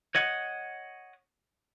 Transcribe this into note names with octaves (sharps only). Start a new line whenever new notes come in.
C#5 D#5 F#5